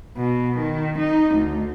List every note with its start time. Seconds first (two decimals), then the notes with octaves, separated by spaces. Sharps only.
0.17 B2
0.57 D#3
0.98 D#4
1.35 D2